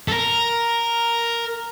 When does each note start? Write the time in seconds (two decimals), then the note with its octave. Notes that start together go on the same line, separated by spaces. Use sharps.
0.08 A4
0.13 A#4